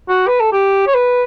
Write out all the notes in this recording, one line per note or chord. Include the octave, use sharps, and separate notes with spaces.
F#4
B4
A4
G4
C#5
B4